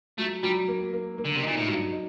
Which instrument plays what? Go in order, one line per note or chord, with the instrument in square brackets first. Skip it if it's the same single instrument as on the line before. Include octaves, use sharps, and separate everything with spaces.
[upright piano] F#3 [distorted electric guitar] A3
[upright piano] F#3 [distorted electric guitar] G3
[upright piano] A#3
A#3
A#3
[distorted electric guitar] D3
C3
[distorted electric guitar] A#2 [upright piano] D#4
[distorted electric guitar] A2
[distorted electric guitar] G2 [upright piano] F#3
[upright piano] D#4